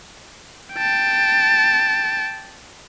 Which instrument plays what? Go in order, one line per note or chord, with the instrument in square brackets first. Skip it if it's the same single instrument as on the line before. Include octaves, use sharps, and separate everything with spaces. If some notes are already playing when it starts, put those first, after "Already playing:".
[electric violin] G5 A5